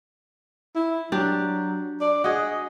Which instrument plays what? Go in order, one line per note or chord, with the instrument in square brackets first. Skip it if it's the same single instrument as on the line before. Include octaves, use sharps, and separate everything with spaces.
[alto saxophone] E4
[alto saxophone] F#3 [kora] D4 G4
[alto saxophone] D5
[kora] F#4 G#4 [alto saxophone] D#5